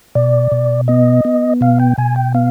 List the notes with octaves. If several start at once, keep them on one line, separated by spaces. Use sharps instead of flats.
B2 D5
B2
B3 D#5
B3
B2 F5
G5
B2 G#5
G5
B3 F5